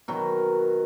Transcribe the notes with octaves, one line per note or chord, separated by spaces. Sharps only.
B2 D#3 F#3